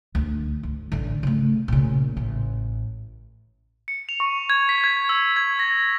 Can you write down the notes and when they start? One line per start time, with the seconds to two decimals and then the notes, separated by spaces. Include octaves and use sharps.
0.15 D2
0.63 D2
0.92 A1 D3
1.23 C#3 A3
1.68 A#2 C#3
2.17 A1
3.88 C#7
4.09 F7
4.20 C#6
4.50 G#6
4.69 B6
4.84 G#6
5.09 E6
5.36 G#6
5.59 A#6